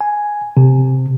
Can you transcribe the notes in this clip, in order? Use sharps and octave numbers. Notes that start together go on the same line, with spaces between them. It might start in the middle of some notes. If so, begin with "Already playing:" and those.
G#5
C3